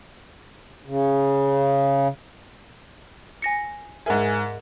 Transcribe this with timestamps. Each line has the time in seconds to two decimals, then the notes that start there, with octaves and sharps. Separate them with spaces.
0.86 C#3
3.42 G#5 A#6 C#7
4.06 G#2 G#4 A#4 E5